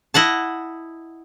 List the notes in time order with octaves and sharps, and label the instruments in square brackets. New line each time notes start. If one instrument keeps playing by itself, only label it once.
[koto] E4 D#5 F#5 A5